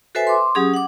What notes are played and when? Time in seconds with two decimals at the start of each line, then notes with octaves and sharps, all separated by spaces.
0.15 F#4 A4 B4 C5 E5 G#5
0.27 C6 D6
0.55 F#3 C#4 G4 G#4 D#6
0.74 F#5 D6